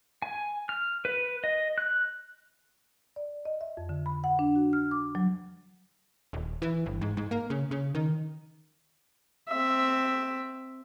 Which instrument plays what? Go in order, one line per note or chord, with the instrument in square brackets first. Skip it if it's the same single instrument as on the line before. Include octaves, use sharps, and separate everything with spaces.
[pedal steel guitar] G#5
F6
B4
D#5
F#6
[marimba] D5
D#5
E5
F2
D3
B5
F#5
D4
F#4
F6
D6
F#3
[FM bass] D#1
E3
G1
G#2
G#2
A#3
C#3
C#3
D#3
[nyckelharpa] C4 E5